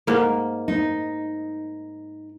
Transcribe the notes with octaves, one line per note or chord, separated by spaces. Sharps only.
G#2 A#3
D#4